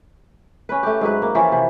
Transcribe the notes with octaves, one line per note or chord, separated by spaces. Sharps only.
C#4 B4
A3 G4
G#2 F#3 B4
A#3
E3 F3 C#4 E4
C3